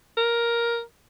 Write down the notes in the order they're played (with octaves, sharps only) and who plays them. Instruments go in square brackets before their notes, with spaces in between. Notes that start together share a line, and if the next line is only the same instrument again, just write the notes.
[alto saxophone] A#4